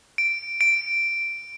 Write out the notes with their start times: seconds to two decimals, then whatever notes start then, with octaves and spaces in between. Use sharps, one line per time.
0.18 D7
0.61 D7